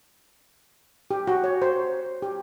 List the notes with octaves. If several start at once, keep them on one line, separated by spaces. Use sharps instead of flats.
G4
F#4
C#5
C5
G4